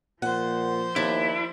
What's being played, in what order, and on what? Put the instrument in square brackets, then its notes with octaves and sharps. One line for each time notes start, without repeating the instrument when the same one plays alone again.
[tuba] A#2 [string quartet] F3 C5 [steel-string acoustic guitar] F#5
[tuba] D#2 [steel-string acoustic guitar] D4 [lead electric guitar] E4